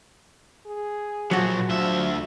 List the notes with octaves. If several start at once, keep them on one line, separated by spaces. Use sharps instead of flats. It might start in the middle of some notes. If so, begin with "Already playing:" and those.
G#4
A#2 F3 F#3 F#4
D2 F3 E5